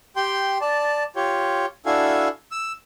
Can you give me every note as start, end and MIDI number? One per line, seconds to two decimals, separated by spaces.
0.16 0.58 67
0.16 0.58 79
0.16 0.58 84
0.61 1.04 74
0.61 1.04 81
1.16 1.66 65
1.16 1.66 67
1.16 1.66 73
1.86 2.28 62
1.86 2.28 64
1.86 2.28 66
1.86 2.28 69
1.86 2.28 77
1.86 2.28 80
2.51 2.72 88